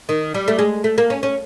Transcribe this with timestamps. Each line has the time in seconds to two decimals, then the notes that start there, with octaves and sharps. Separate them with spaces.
0.09 D#3
0.34 G3
0.48 A3
0.59 G#3
0.84 A3
0.98 A#3
1.10 C#4
1.23 C#4